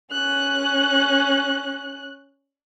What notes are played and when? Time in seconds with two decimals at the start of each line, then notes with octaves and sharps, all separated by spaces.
0.12 C#4 F#6